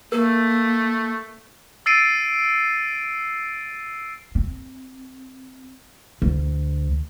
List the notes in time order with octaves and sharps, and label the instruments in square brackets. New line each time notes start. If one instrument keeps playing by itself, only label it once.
[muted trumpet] A3 [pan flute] A#3 [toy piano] A#4
[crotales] E6 A6 C7 D7 D#7
[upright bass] C4
D2